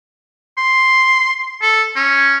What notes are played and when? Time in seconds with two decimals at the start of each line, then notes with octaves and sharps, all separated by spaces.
0.57 C6
1.62 A4
1.96 C#4